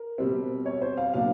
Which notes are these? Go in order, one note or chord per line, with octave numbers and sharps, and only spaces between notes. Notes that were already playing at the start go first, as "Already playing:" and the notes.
Already playing: A#4
B2 G3 C4
C#5
C5
F5
B2 F#3 A#3 D4 F5